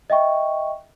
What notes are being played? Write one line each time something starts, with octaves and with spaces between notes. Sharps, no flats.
D#5 E5 G5 C#6